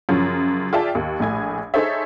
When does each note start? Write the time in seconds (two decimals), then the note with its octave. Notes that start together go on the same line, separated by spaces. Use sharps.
0.09 F#2 C#3 F3 C#4 F4
0.73 F4 G#4 D5 E5 G5 A5
0.95 D#2
1.20 A#1 A2 G#5 G#6
1.74 D#4 G#4 A4 C5 C#5 E5